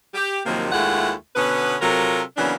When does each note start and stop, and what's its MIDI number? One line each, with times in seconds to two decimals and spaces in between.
0.14 0.40 67
0.46 0.69 39
0.46 0.69 48
0.46 0.69 51
0.46 0.69 53
0.46 0.69 54
0.46 0.69 58
0.72 1.13 39
0.72 1.13 56
0.72 1.13 57
0.72 1.13 64
0.72 1.13 65
0.72 1.13 78
1.36 1.76 47
1.36 1.76 50
1.36 1.76 59
1.36 1.76 61
1.36 1.76 71
1.82 2.21 48
1.82 2.21 54
1.82 2.21 65
1.82 2.21 69
1.82 2.21 70
2.37 2.54 49
2.37 2.54 52
2.37 2.54 54
2.37 2.54 58
2.37 2.54 59
2.37 2.54 62